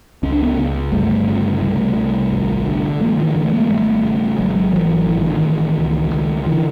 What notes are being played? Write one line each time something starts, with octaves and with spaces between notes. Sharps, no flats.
C#2 C#4
D4
B3 C#4
C#2
G1 G3 A3
C#3
C2 G3 A3
C2
G#1
D3
A1 G#3 A#3
D#3 F3
A1 D3 E3
A3
G#3 A#3
G#1 G3 A3
C#3
G#1 F#3 G#3
G#1 E3 F#3
A1 E3
D#3
D3
D#3
A1
C#2
C#2
D3 E3